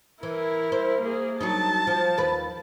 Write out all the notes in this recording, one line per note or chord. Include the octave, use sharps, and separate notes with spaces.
E3 E4 A#4
C5
A#3 G#4
F#3 D4 D#4 A5
F3
D#2 A#4 B4